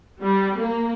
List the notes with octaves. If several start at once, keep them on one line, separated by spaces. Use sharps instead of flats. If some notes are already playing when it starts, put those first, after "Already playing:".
G3
A#3